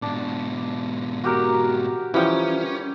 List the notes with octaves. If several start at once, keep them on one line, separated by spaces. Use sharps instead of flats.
G#2 B2 D4
F#4 G4 A#4
E3 F3 G3 C#4 G5